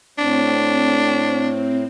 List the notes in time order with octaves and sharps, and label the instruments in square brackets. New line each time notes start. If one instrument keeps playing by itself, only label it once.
[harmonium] A2 [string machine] C4 [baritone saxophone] D4